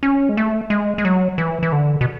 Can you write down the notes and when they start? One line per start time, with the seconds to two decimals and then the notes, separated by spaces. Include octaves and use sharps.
0.03 C#4
0.29 G#3
0.37 A3
0.70 G#3
0.98 G#3
1.05 F#3
1.38 E3
1.63 E3
1.72 D3
2.01 B2